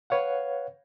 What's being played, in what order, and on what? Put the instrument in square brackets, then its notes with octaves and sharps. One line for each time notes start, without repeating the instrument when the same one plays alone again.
[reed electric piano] B4 C#5 F5 F#5